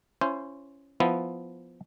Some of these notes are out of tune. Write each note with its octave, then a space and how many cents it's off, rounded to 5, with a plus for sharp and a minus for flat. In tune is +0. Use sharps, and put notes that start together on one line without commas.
C#4 +0 E4 +30 C5 +0
F3 +0 B3 +5 E4 +0